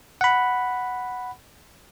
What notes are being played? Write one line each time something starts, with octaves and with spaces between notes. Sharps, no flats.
F#5 B5